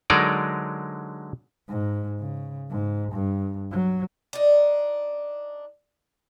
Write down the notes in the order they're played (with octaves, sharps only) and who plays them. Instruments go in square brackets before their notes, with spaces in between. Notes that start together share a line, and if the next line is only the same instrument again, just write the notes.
[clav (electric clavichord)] D3 F#3 G#3 D#4 A#4 D5
[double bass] G#2
C#3
G#2
G2
F#3
[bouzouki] D4 D#4